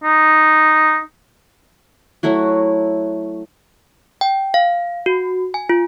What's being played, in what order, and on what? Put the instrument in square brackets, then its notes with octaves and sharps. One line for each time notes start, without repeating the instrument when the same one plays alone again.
[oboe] D#4
[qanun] F#3 A3 E4 F#4
[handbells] G5
F5
F#4
G#5
F4